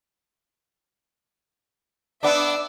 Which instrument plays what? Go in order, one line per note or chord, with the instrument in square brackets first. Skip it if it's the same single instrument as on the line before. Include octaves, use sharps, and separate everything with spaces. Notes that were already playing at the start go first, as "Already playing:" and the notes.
[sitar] B3 D4 [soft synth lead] D5 [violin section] E5 D6 E6